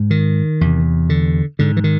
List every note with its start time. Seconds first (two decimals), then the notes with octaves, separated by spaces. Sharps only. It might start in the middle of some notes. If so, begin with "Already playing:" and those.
Already playing: G#2
0.10 D#3
0.61 E2 C3
1.09 D3
1.59 G#2 D3
1.77 E3
1.84 D#3